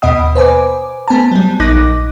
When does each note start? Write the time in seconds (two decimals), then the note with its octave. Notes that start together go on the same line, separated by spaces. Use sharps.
0.02 D#2 B2 B3 D#5 F#5 D#6
0.35 B4 C5 G#5 D6
1.08 A3 B3 C5 G#5 A5
1.32 F#3 G3
1.60 A#1 D#4 D#5 D6 F#6 A#6